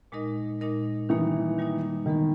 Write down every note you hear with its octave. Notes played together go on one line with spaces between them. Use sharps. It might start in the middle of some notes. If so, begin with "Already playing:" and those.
A#2 G#3 D#4 A#4 D#5
A#2 G#3 D#4 A#4 D#5
D#3 E3 G3 A#3 D#4
D#3 G3 A#3 D#4
D#3 E3 G#3 B3